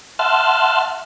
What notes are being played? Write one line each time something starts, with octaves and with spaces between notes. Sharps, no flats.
E5 F#5 A5 C6 F6